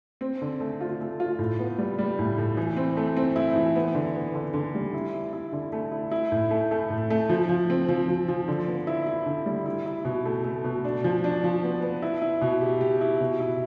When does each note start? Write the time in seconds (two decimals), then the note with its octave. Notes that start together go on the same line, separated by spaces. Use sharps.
0.21 C4
0.42 D3
0.60 A3
0.81 F4
1.01 A3
1.20 F4
1.39 A2
1.59 B3
1.78 G3
1.99 G3
2.19 A2
2.38 A2
2.57 E3
2.77 C4
2.97 A3
3.17 C4
3.36 E4
3.56 E3
3.75 B3
3.95 D3
4.15 B3
4.35 D3
4.54 D3
4.75 G3
4.94 E4
5.14 E4
5.33 E4
5.53 D3
5.72 A3
5.92 E4
6.11 E4
6.32 A2
6.51 A3
6.71 A3
6.90 A2
7.10 A3
7.29 F3
7.49 F3
7.70 C4
7.89 F3
8.08 F3
8.28 F3
8.48 D3
8.68 B3
8.87 E4
9.06 E4
9.26 D3
9.46 G3
9.66 E4
9.86 E4
10.05 B2
10.25 A3
10.44 A3
10.64 B2
10.84 D4
11.04 F3
11.24 D4
11.44 F3
11.63 B3
11.82 B3
12.02 E4
12.22 E4
12.41 B2
12.61 G4
12.81 G4
13.01 E4
13.20 B2
13.40 E4